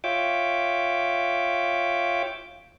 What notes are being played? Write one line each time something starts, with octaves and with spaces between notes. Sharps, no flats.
F4 C#5 E5 G5 D6